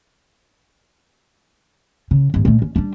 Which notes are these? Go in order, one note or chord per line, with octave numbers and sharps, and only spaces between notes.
C#3
G1 G#2
A#2 A3
C#4
G3 D4